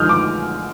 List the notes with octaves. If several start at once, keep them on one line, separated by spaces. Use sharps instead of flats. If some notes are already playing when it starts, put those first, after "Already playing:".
Already playing: D3 F3 G#3 D#6 F6 G6
D6